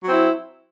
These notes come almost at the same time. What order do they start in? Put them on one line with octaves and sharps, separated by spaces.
F#3 C4 E4